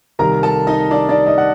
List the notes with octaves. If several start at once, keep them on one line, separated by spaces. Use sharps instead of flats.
C2 C3 D#3 A#4 A#5
A4 A5
D#4 D#5
D4 D5
D4 D5
D#4 D#5
F#5